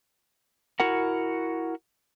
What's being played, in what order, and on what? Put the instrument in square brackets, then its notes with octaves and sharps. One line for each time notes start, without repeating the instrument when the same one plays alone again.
[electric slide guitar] E4 F#4 A#4 F#5